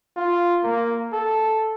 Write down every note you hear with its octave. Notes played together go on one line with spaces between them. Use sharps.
F4
A#3
A4